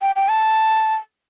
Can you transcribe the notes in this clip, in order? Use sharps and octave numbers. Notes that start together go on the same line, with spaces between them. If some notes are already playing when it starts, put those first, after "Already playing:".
G5
G5
A5